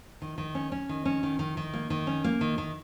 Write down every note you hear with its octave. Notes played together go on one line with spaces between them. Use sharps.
D#3
D#3
C#4
C#4
D#3
C#4
D#3
D#3
D#3
A#3
D#3
C#4
A#3
D#3
D#3